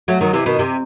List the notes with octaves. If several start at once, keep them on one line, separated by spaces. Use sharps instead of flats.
F#3 A3
D#3 F#3
C3 E3
B2 D#3
C3